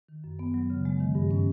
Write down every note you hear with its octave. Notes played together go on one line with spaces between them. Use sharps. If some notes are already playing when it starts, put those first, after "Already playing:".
D#3
F#2
B3
F#3
C#3
G#3
D#3
G2
C#4